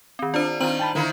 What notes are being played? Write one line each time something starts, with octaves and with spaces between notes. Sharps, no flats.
D#3 C4
D4 F4 C5
D#3 C4 F4 C5 A#5 F#7
G5 A5 B5
D3 D#3 A#3 E4